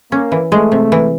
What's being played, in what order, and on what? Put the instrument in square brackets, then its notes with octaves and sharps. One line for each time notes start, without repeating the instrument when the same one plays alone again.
[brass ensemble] A#3 [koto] C#4
[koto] E3
[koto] G#3 [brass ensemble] A3
[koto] C3
E3